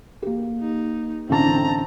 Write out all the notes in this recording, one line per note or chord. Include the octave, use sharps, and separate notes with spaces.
A#3 G4
D#4
A1 D3 C4 A5 A#5